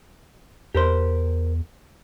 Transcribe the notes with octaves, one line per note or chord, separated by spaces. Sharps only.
E2 G4 A#4 C5